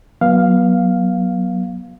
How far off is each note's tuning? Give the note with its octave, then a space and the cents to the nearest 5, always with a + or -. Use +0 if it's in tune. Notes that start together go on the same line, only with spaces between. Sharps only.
F#3 +0 B3 -30 F5 +0